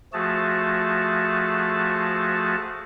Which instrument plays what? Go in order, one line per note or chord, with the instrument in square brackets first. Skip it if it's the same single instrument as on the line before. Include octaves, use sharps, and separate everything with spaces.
[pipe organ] F3 A3 F#4 G#4 A5